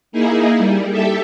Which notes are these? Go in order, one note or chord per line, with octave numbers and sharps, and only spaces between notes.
A#3 D#4 E4 G#4
G3
G4 A4 E5